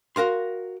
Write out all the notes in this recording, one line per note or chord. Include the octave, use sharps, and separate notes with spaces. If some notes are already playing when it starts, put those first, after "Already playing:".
F#4 A#4 F5 C6